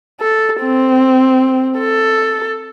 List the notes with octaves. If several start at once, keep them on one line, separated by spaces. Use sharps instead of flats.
A4
C4
A4